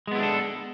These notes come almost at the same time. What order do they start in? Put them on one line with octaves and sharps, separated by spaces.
G#3 B3 E4 D4 A4